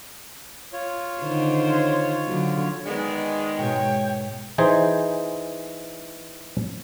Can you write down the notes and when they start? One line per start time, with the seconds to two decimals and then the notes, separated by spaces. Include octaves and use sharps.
0.73 F4 C#5
1.22 D3 D#3 C5
2.27 D3 F#3
2.86 D#3 G#3 B3 D5
3.58 G#2 B2 C#5 G5
4.58 E3 D#4 G#4 C5